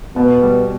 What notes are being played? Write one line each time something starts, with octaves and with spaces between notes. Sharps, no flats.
B2 B3
G3